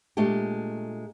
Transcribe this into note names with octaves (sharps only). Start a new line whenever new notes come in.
A#2 G#3 A3 D4 G4